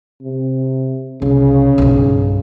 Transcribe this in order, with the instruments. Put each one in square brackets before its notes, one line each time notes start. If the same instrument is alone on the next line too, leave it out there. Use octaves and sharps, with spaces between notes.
[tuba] C3
[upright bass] C2 [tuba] C#3
[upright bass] B1 G2